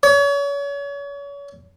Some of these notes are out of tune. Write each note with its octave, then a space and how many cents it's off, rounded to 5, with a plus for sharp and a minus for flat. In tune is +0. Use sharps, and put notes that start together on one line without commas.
C#5 +35